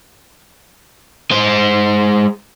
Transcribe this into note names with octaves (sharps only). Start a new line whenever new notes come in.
G#3 C5